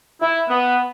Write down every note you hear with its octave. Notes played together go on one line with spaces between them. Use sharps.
E4
B3